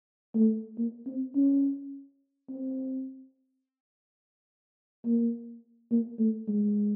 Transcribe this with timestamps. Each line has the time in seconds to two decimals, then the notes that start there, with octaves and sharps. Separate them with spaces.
0.35 A3
0.78 A#3
1.06 C4
1.35 C#4
2.50 C4
5.05 A#3
5.91 A#3
6.19 A3
6.48 G#3